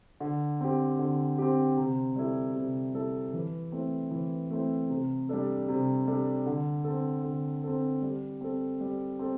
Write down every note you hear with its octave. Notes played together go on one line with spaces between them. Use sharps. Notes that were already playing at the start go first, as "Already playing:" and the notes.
D3
C4 G4
D3
C4 G4
C3
G3 E4 A4
C3
G3 E4 A4
E3
A3 C4 E4
E3
A3 C4 E4
C3
G3 D4 A4
C3
G3 D4 A4
D3
C4 A4
D3
C4 A4
G3
C4 A4
G3
C4 A4